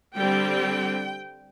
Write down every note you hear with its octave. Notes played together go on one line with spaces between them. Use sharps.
D3 G3 C4 G5